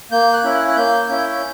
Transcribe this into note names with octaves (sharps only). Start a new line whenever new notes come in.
A#3 G6
F#6
C#4 E4
F#6
F#6
A#3 G6
C#4 E4